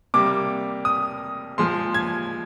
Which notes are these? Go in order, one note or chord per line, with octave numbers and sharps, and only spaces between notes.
C3 G3 A#3 D6
D#6
A#2 F3 G#3 C6
G#6